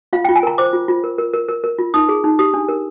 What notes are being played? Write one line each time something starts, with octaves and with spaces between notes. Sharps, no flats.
F4 F5
G5
F4
G#5
A#4 A#5
C5 D6
F4
F4
A#4
A#4
A#4
A#4
A#4
F4
D#4 D#6
G#4
D#4
G4 D#6
D4
A#4